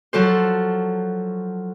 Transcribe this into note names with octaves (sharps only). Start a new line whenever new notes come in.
F3 F#3 A4 C5